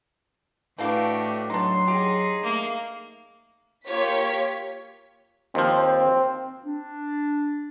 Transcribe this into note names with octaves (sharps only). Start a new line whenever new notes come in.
A2 E3 A3 D4 F#4 G4 F5
F#3 D4 D#4 C6
D#4 G4 G#4
A3 A#3
A#3 F4 G4 C#5 B6
D#2 F3 C4
D4